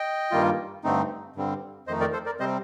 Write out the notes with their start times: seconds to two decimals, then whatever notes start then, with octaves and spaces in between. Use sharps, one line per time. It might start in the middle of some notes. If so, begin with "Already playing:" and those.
Already playing: D#5 G5
0.31 G2 D#3 G3 A#3 F4
0.84 G2 D3 A3 C4 D#4
1.36 G2 D3 G3 C4
1.87 F2 D#3 A3 D#4 C5 D#5
2.00 A#4 D5
2.13 A4 C5
2.26 A#4 D5
2.40 C3 G3 C4 C5 D#5